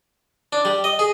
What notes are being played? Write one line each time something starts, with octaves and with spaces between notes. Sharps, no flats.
D4
G3
D#5
G#4